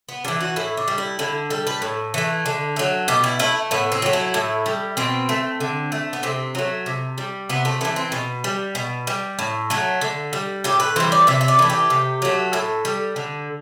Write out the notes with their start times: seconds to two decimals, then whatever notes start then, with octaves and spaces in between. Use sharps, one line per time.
0.09 B3
0.25 E3 G3 D4
0.41 F#4
0.56 A2 E4
0.77 D4
0.88 G3
0.98 E4
1.19 D3 E4
1.50 G3 A4
1.67 B4
1.82 A2
2.14 E3 A3
2.46 D3
2.76 F#3 A3
3.08 B2 G4
3.24 E4
3.39 A3 E4
3.71 A2 B3
3.92 C4
4.02 F#3 A3
4.13 E4
4.34 A2
4.66 G3
4.97 B2 C4
5.29 A3
5.60 D3
5.92 A3
6.13 B3
6.23 C3 C4
6.55 F#3 A3
6.86 C3
7.18 G3
7.49 C3 B3
7.65 A3
7.81 E3 B3
7.85 A3
7.96 C4
8.12 B2
8.44 G3
8.75 B2
9.07 G3
9.39 A2
9.70 F#3 A3
10.01 D3
10.33 G3
10.64 A2 G4
10.80 B4
10.96 E3 G3 C5
11.12 D5
11.27 C3 E5
11.41 E5
11.48 D5
11.59 E3 A3
11.70 G4
11.90 C3
12.22 F#3 A3
12.53 A2 A4
12.85 G3
13.16 D3